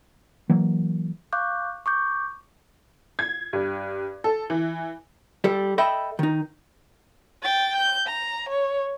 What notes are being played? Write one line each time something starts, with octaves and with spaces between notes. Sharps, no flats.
E3 F#3 A#3
F5 C#6 D6 F#6 G6
C#6 D6 G6
G#6
G2
A4
E3
G3 A4
A4 D#5 E5 G5 B5
D#3 D#4
G5 A6
G6
A#5
C#5